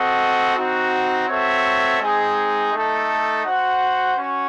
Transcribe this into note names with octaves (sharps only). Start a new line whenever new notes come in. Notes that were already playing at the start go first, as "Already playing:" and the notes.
Already playing: C4 F#4 A4 D#5 F#5
C4 D#4 F#4
C4 F#4 A4 C#5 E5
G#3 C4 D#4 G#4
A3 D#4 A4
F#4 C5 F#5
C#4 F#4